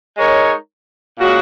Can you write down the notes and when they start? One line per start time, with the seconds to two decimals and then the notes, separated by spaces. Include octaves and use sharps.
0.18 G#3 D#4 A#4 C#5
1.19 A#2 G#3 C#4 F#4